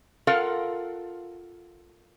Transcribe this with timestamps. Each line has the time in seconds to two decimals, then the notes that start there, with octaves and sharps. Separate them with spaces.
0.27 F4 A4 A#4 F5 F#5